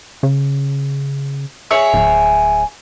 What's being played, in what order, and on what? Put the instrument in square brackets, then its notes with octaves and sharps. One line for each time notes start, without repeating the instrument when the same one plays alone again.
[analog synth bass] C#3
[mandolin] G#4 C#5 E5
[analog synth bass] D1